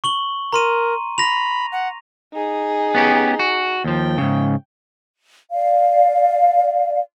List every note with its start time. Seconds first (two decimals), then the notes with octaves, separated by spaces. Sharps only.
0.04 C#6 F#7 G7
0.53 A#4 A#5 C6 D#7
1.18 B5 A#6 F7
1.72 F#5
2.33 D#4 G#4
2.95 B3 C#4 G4
3.39 F#4
3.84 D#2 F3 G5
4.18 G#2 C#3
5.52 D5 F5